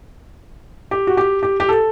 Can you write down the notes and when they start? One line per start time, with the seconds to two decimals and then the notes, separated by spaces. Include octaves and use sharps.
0.91 G4
1.07 F#4
1.17 G4
1.43 G4
1.60 G4
1.69 A4